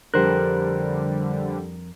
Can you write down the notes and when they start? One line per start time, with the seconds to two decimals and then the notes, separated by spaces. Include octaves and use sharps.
0.14 F2 D3 G3 G4 A#4 C5 F#6